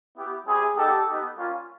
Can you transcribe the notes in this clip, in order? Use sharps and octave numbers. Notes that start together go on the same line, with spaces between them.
B3 E4 G4
G3 C4 E4 G4 G#4
G3 B3 D#4 G4 A4
B3 D#4 G4
G3 A#3 C#4 F4